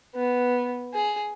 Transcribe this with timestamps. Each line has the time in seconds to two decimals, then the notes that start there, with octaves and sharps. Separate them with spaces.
0.15 B3
0.94 G#4